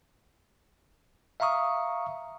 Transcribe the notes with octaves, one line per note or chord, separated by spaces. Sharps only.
E5 F5 A#5 C#6 D#6